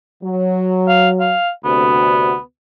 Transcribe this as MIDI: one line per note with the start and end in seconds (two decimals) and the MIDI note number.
0.23 1.33 54
0.88 1.09 77
1.20 1.50 77
1.64 2.35 38
1.64 2.35 48
1.64 2.39 59
1.64 2.35 66